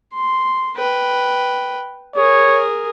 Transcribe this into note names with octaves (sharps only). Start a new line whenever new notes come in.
C6
B4 G5
G#4 A#4 C#5